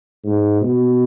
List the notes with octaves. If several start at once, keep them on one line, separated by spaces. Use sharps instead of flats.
G#2
B2